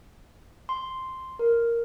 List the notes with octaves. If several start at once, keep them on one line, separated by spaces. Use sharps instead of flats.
C6
A#4